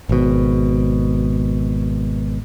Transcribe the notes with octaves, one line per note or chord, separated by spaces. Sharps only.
G#1 B2